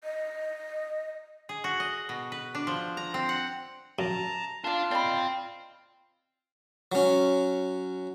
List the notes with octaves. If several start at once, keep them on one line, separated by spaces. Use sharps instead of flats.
D#5
G#4
F#4
D#5
B2
B4
D4
F3
A#5
C4
F#5
F#2 A5 A#5
D4 F4 D5 F5 A5
C4 D5 D#5 B5
F#3 C#4